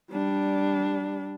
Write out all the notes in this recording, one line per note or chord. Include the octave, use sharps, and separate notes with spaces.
G3 D4